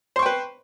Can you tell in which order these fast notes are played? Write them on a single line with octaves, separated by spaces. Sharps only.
C5 C#6 G5 B4